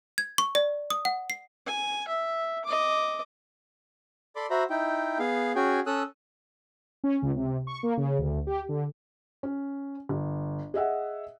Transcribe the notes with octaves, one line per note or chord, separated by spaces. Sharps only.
G#6
C#6
D5
D#6
F#5
C7
G#5
E5
D#5 D6
A4 D5 B5 C6 D6
F#4 C5 E5 A#5 B5
D#4 E4 G5
B3 G#4 F5
C#4 F#4 G#4 G5 G#5
C#4 A4 D#6 E6 F#6
C#4
C#2
C3
C#6
A#3
C#3
D2
G4
D3
C#4
G1
G#4 D#5 E5 F#5